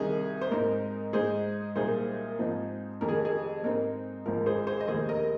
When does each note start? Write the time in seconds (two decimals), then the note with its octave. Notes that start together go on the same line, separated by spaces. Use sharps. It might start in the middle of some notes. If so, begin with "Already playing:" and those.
Already playing: C2 C3 D#3 A#3 D#4 G#4
0.41 C5
0.51 G#2 G#3 C4 D#4 A#4
1.13 G#2 G#3 D#4 G#4 C5
1.76 C2 A#2 G#3 D#4 G#4 C5
2.39 G#2 F3 C4 D#4
3.01 F1 F2 D#3 A#4
3.09 G#4
3.25 G#4
3.63 G#2 G#3 C4 D#4 A#4
4.26 G#1 G#2 F3 A#4
4.46 G#4 C5
4.67 G#4 C5
4.80 D#5
4.87 F1 D#2 D#3 G#4 C5
5.09 A#4 D#5